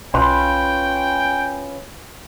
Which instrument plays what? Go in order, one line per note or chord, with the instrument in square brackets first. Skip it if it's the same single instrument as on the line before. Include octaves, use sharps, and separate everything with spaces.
[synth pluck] B1 [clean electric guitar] C#4 F4 B4 [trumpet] G5 [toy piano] B5 C6